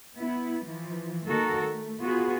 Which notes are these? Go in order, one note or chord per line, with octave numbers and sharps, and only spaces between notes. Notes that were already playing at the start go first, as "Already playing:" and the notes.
B3 E4
E3 F3
D#3 A#3 F#4 A4 A#4
A3
B3 F4 F#4 G#4